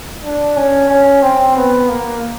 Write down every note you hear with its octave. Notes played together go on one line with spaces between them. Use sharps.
D4
C#4
C#4
C4
B3
A#3